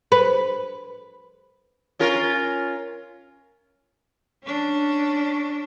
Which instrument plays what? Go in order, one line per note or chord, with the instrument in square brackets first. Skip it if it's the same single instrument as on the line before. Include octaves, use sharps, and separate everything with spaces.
[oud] B4
[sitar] C#4 F4 A#4
[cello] C#4 D4